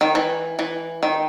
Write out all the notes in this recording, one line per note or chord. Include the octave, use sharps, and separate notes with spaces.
D#3
E3
E3
D#3